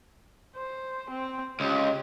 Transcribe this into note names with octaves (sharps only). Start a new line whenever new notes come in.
C5
C4
C#2 G4